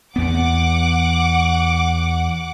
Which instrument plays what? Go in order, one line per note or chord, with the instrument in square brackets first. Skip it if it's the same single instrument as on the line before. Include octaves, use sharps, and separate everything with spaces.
[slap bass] E2 B3 [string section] F#5 D6